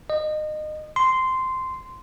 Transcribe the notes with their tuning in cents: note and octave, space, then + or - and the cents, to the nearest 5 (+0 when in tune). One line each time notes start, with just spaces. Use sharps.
D#5 -25
C6 -10